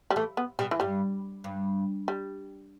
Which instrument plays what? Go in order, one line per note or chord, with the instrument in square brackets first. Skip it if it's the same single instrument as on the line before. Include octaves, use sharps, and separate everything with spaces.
[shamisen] G3
[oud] E3 [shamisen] A3
[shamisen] B3
[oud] B2 [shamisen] G3
[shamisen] E3
[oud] G2 [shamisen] G3
[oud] G2
[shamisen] G3